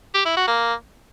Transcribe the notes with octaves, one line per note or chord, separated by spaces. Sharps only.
G4
E4
F#4
A#3